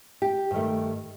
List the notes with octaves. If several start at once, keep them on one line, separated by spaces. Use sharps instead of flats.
G4
G2 D#3 A3